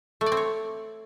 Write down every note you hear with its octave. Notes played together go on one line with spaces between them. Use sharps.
A3
D5
C4
C#5